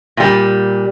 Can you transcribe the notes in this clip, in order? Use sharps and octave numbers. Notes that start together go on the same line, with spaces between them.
A#2 G3